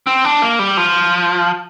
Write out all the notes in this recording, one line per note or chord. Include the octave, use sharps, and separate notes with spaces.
C4
D4
A#3
G3
F3